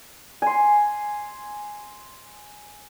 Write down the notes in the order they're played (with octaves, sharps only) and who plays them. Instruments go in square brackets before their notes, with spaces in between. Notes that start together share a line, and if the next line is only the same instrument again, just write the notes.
[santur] G#5 C6